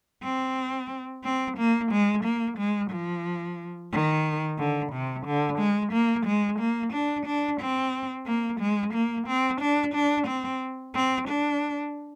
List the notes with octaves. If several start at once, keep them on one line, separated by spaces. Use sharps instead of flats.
C4
C4
A#3
G#3
A#3
G#3
F3
D#3
D3
C3
D3
G#3
A#3
G#3
A#3
D4
D4
C4
A#3
G#3
A#3
C4
D4
D4
C4
C4
D4